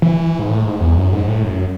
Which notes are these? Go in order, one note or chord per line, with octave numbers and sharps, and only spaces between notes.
E3
G#2
A2
G#2
E2
F#2
G#2
A2
F#2